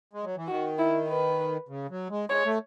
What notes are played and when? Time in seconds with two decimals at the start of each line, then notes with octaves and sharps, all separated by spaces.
0.13 G#3
0.24 F#3
0.36 E3
0.48 D#3 F#4
0.78 E4
1.08 B4
1.69 C#3
1.90 F#3
2.10 G#3
2.29 G#3 C#5
2.45 A3